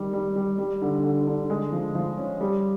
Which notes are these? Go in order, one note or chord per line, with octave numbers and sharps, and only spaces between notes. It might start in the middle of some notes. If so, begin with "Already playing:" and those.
Already playing: D#3 G3
G3
G3
G3
D3
D3
D3
G#3
F3
F3
C#4
G3